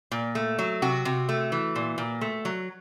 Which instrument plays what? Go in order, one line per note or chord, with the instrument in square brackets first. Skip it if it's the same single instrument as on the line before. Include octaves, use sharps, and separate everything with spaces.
[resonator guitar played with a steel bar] A#2
A3
F#3
C3 F#4
C3
A3
E3
A#2
A#2
A3
F#3